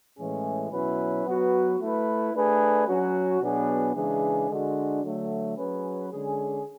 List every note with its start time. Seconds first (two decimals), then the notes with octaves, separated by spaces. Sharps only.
0.18 A2 E3 G#3 C#4 G#4
0.71 B2 F#3 C#4 E4 B4
1.25 F#3 B3 F#4 B4
1.79 A3 E4 B4
2.34 A3 D4 G#4 B4
2.88 F#3 C#4 F#4
3.41 B2 F#3 B3 D4 G#4
3.95 C#3 E3 G#3 D4 G#4
4.49 D3 G#3 D4 F#4
5.04 D3 F#3 A3
5.57 F#3 C#4 G#4 B4
6.11 D3 G#3 C#4 G#4